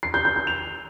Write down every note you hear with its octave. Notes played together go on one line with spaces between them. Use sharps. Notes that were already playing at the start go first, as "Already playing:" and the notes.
C7
G6
G6
G6
F7